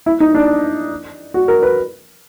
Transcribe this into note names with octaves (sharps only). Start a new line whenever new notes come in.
E4
D#4
D4
F#4
A#4
B4